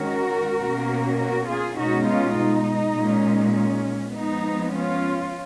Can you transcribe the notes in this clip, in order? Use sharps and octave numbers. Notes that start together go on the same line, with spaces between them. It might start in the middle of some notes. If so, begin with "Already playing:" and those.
Already playing: D#3 G#3 C#4 F#4 A#4
B2 A#3 C#4
F#4 A#4
F4 G#4
B2 G#3 C#4 D#4 F#4
C#4 F4
D#4
A#2 G#3 C#4
C#4
F3 G#3 B3 D#4
C#4 F4